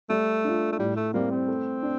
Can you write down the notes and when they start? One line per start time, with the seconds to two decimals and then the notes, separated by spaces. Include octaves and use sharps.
0.10 G3 A3
0.44 D4 F4
0.72 A3
0.78 A2 G3
0.96 A3
1.14 G3 A#3 C4
1.31 C4
1.48 A3
1.83 D4